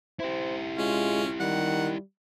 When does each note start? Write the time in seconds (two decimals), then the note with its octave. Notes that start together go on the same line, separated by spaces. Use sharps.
0.20 E4 G4 C5
0.78 G#3 C#4 F4
1.40 D#3 G3 F#5